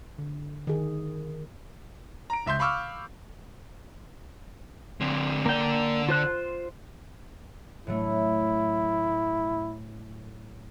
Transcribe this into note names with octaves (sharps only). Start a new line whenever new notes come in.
D3
D#3 G#4
A#5 D7
C#2 E5 C6 G6
F5 B5 C#6 D6 E6 F6
D3 C4
D3 A#3 D5 G5
F4 C5 F#6
A2 F#3 A3 E4